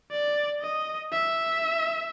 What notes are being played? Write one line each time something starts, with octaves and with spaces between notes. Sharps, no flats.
D5
D#5
E5